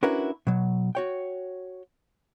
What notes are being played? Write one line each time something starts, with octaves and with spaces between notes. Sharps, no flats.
C#4 D4 E4 F#4 A#4 B4
B2 F#3
F#4 C#5 G5